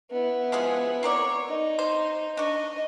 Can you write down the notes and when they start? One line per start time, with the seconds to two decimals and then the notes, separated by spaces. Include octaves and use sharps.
0.11 B3 E4
0.52 F3 G#3 G#4
1.03 C4 A#4 C#5 D5
1.48 D#4
1.79 C5
2.37 D4 D#5 C#6